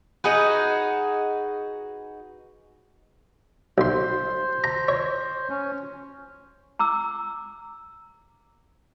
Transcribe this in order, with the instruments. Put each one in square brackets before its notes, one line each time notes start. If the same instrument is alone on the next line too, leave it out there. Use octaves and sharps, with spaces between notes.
[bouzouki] D#4 F#4 G#4 B4
[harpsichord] B1 C6 [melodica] C5
[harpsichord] A#5
C#5
[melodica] C#4
[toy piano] A#5 D6 E6